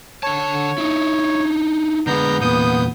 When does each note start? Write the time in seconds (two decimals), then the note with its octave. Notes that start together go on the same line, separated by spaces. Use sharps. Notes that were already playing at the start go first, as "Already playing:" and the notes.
0.23 D3 C#5 A5
0.78 D#4 E4
2.07 D3 G#3 B3 A#5 G6
2.41 E2 A#2 B3 D#6 G6